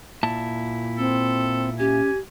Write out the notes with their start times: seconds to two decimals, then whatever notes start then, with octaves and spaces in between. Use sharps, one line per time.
0.23 A#2 E4 A5
0.98 C4 A4
1.79 C#4 G4 G#5